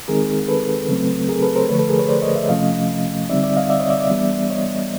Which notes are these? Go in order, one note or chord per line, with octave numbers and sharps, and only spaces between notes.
D#3 G#3 C4 D#4 G#4 A#4
A4 B4
C#3 F#3 A3 C4
G#4 A#4
A4 B4
A#4 C5
D3 F3 A3 B4 C#5
A4 B4
G#4 A#4
B4 C#5
C5 D5
C#5 D#5
D5 E5
C3 F3 A3 C#4 D#5 F5
D3 G3 C4 D#4 D5 E5
D5 E5
D#5 F5
D5 E5
C#5 D#5
D5 E5
D5 E5
E3 G3 B3 D4
C#5 D#5